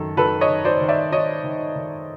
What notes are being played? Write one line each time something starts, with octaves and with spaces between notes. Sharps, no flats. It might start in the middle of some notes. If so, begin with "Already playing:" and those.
Already playing: F#2 D#3 A4
D#3 A4 B4
C#5 D#5
D#3
C5 D5
D#3
D5 E5
D#3 C#5 D#5
D#3
D#3